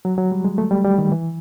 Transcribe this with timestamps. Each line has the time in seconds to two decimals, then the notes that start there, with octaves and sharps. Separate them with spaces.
0.05 F#3
0.18 F#3
0.32 G3
0.44 G#3
0.58 A3
0.71 G3
0.84 G3
0.98 D#3
1.12 E3